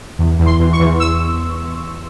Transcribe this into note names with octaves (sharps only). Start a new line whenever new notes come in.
E2
E2
C6
E2
C#6
E2
E6